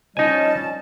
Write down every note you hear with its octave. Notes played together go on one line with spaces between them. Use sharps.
F3 G3 C#4 D#4 D#5 G#5 A5